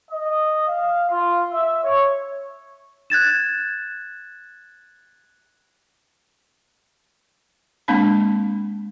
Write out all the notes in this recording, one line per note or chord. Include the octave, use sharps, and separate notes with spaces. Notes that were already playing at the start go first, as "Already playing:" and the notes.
D#5
F5
F4
E5
C#5
F#6 G#6 A6 E7
G#3 A#3 C4 D4 A5 B5